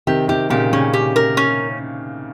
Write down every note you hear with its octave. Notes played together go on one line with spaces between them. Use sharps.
C3 D#3 G4
C3 D#3 G4
A#2 C#3 G4
A#2 C#3 C#4
G4
A#4
C#4